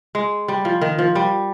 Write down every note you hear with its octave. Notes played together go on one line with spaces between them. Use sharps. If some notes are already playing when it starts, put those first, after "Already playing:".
G#3
G3
F3
D#3
F3
G3